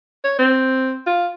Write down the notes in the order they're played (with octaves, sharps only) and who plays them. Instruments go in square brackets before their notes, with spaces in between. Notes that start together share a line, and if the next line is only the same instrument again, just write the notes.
[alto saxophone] C#5
C4
F4